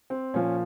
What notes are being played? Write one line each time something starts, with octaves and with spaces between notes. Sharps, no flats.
C4
A#2 F3 C#4